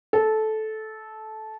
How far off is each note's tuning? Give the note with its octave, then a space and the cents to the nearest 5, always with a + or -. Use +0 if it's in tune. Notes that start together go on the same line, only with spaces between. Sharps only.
A4 -15